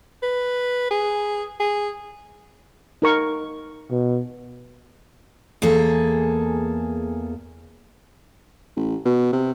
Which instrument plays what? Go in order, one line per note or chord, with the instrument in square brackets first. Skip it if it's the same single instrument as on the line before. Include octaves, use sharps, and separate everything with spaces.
[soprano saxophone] B4
G#4
G#4
[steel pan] D#4 A#4 C#6
[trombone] B2
[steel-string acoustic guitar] E2 A#3 G#4 A4
[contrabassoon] A1
B2
C3